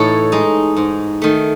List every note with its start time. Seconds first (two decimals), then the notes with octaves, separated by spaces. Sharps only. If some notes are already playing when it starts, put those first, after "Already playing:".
Already playing: A2 E3 D#4 A4 C#5
0.32 G#3 D#4
0.76 G#2
1.22 D#3 A3